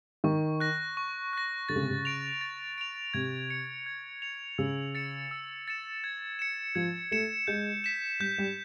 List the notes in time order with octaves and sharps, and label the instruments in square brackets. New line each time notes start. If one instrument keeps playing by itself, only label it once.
[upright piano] D#3 [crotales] C#6
[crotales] F#6 A#6
C#6
F#6 A#6
[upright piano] D3 [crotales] A6
[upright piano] C#3
C3
C#3
[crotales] D7 F7
A6
D7 F7
[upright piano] C3 [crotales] G#6
[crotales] C#7 F7
G#6
C#7 F7
[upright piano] C#3 [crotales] E6
[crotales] A6 C#7 E7
E6
A6 C#7 E7
G#6
C#7 E7
[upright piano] F3 [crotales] G#6
[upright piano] A3 [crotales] C#7 E7
[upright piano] G#3 [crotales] G6
[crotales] B6 E7
[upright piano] G3 [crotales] G6
[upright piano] G3